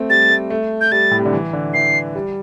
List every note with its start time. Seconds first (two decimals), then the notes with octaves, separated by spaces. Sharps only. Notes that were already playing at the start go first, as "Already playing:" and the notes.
Already playing: A3 C4
0.10 G3 A6
0.30 A3
0.50 A3
0.81 G6
0.92 G3 A6
1.11 A2
1.18 C3
1.25 D3
1.33 E3
1.53 D3
1.74 E3 C7
2.15 G3